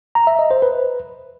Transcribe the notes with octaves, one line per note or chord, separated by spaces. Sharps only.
A#5
E5
D#5
C5
B4